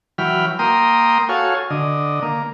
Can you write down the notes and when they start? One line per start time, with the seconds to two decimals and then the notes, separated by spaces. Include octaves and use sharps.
0.18 E3 F#3 G5 B5 F6
0.59 A#3 G5 A#5 C6 D#6
1.29 F#4 A4 C#5 F5 G#5
1.70 D3 D#5
2.22 A#3